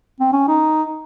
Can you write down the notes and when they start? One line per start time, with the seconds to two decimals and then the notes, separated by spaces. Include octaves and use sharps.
0.20 C4
0.32 C#4
0.48 D#4